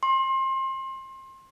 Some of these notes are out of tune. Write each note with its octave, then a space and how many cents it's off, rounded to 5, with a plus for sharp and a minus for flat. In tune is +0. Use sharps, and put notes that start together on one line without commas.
C6 +30